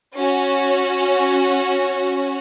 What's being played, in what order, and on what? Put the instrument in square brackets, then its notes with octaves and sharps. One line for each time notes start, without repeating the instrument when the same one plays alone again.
[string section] C#4 F#4